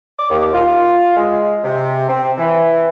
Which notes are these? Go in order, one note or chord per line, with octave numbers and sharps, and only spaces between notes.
D6
D#2
F4
G#3
C3
C4
E3